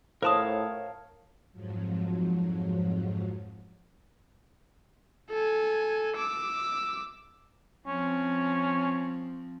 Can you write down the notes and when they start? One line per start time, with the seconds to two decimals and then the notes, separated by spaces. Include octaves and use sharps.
0.23 A2 A#4 C5 C#5 F5 A5 C6 D#6
1.53 F2 G#2 F3 F#3
5.30 A4 G#5
6.16 D6 E6
7.87 F3 C4 C#4